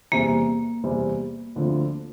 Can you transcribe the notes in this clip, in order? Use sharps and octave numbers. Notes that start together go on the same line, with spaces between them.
E2 C3 G3 A#3 C4
E2 C3 G3 C4
D2 D3 F3 C4 F4